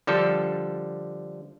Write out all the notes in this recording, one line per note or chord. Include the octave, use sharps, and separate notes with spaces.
D3 F3 G3 A4